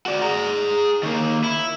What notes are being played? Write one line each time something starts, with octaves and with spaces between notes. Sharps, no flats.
F#4 D5
G#4 A#5
D#3 A#3
E4